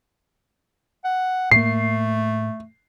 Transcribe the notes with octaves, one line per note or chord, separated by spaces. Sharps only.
F#5
A2 A3 A#3 C7